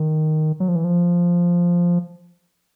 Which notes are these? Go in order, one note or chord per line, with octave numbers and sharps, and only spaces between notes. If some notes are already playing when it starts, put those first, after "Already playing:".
Already playing: D#3
F#3
F3
E3
F3